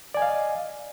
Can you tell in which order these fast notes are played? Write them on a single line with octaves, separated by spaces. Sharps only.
D5 G#5 D#5 F5